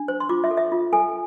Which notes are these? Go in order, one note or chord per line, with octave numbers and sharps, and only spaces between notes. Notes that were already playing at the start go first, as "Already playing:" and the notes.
Already playing: D4
C5
C6
F4 D6
E5
A4
E5
F4
A4 G#5